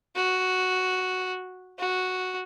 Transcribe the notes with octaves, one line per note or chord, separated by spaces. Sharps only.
F#4
F#4